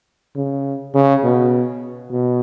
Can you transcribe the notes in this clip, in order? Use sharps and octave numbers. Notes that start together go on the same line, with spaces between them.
C#3
C#3
B2
B2